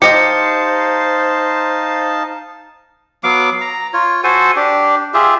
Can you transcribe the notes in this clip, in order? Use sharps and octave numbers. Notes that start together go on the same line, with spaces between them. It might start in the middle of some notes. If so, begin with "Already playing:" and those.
D#4 G4 C5 D#5 F5 A5 C#7
F#3 B3 F5 D6
A#5
F4 C#5
F#4 A4 C5 G#5
D4 G4
F4 G4 G#4 E5